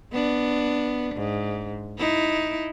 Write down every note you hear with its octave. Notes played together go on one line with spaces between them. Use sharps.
B3 D4
G#2
D#4 E4